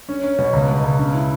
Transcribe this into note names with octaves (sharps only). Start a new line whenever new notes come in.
C#4
C#4
B2
C#2
B2
C#2
C#3
E4